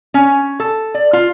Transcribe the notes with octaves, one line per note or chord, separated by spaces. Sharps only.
C#4
A4
D5
F4